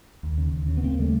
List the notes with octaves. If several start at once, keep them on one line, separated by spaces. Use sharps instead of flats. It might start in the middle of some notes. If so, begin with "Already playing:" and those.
D#2
C#3
D#2
C#3
B3
D#2 A#3 C4
C#3 G3 A3